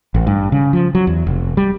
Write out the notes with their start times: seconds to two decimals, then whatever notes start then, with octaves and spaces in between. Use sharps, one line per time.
0.14 A1
0.27 G2
0.52 C#3
0.73 F3
0.95 F#3
1.07 E2
1.27 F1
1.57 G3